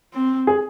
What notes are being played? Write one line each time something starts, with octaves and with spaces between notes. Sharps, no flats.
C4
G#4